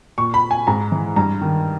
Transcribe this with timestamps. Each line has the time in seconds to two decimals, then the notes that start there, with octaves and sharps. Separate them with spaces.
0.18 A#2 C#6
0.34 B5
0.51 G#5
0.67 G#2 A#5
0.92 E3
1.16 G2 A#5
1.41 D#3